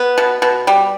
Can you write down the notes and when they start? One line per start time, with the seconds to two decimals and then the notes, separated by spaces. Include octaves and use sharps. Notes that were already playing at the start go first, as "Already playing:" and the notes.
Already playing: B3
0.18 B2
0.42 B2
0.67 G3